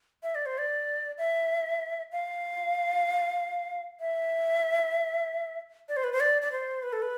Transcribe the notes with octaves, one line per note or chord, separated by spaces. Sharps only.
E5
D5
C5
D5
E5
F5
E5
D5
C5
B4
C5
D5
D5
C5
B4
A4
B4